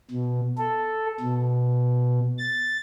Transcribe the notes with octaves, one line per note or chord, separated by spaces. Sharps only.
B2
A4
B2
A6